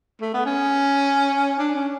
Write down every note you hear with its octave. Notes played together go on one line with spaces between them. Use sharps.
A3
B3
C#4
D4
C#4